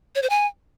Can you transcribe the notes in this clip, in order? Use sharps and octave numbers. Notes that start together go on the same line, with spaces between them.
C#5
C5
G#5